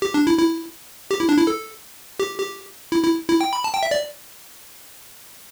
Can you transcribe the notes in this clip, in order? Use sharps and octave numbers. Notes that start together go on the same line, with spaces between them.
G4
D4
E4
E4
G4
E4
D4
E4
A4
G4
G4
E4
E4
E4
G5
B5
A5
G5
E5
D5